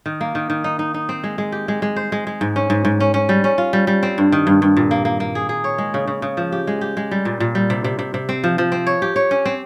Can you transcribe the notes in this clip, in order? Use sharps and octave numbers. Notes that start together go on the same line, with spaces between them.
D#3
A#3
D#3
D#3
D#4
D#4
D#4
C4
G#3
G#3
G4
G#3
G#3
C5
G#3
G#3
G#2
C#4
G#2
G#2
C#4
C#4
G3
C#4
F4
G3
G3
C4
G2
D#3
G2
G2
A#2
A#3
A#3
A#3
G#4
G#4
C#5
G#3
C#3
C#3
C#3
F3
G4
G#3
G4
G#3
G3
A#2
A#2
G3
C3
C3
C3
C3
C4
F3
F3
C4
C#5
G4
C#5
C#4
C4